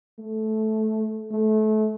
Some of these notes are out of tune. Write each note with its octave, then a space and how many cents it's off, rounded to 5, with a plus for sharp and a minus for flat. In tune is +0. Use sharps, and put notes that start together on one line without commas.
A3 -15
A3 -30